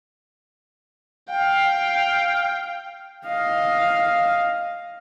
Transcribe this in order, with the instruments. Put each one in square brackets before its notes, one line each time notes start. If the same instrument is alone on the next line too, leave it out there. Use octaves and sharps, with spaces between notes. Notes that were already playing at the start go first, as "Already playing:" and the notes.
[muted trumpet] F5 [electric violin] G5
[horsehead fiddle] D#5 F5